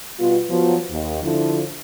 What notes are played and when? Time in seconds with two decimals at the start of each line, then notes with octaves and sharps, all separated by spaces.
0.19 B2 G3 B3 F4
0.49 F3 F#3 B3
0.90 D#2
1.23 D3 F3 E4